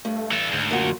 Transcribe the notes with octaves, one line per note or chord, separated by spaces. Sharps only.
G2 A3
E3 A4
D2 G#2
F#2 A#2 F#4